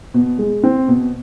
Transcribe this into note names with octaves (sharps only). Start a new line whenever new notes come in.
B2
G#3
C4
B2